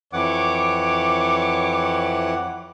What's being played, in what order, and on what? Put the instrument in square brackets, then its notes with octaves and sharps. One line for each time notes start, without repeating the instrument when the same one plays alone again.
[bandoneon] F2 E3 F#5 [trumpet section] C#5 D6